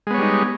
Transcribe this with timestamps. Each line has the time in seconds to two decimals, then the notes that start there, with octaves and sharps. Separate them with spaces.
0.07 G#3
0.11 B3
0.14 C#5
0.18 G3
0.22 D#4